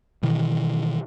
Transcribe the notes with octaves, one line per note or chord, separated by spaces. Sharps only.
B2 D#3 E3